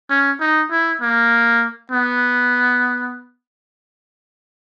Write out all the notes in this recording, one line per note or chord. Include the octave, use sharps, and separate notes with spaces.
C#4
D#4
E4
A#3
B3